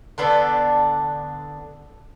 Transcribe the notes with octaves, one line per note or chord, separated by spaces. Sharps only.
D3 B3 D4 A4